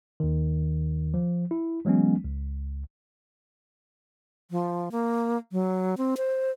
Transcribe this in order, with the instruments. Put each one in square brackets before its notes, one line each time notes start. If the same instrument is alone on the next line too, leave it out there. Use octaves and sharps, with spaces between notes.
[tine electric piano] D#2 D#3
F3
E4
E3 F#3 G#3 B3 C#4
C#2
[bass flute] F3
A#3
F#3
C4
C5